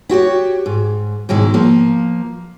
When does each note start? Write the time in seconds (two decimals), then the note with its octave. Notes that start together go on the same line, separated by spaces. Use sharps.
0.09 E4 F#4 G4 C#5
0.66 G#2
1.29 G#2 B2 D#3 G#3 E4
1.54 F3 A#3